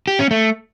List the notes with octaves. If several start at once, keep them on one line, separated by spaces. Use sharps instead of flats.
G4
C#4
A3